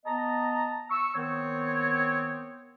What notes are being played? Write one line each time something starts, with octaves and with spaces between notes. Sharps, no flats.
B3 D#5 A5 A#5
C#6 E6
D#3 B3 C4 C#5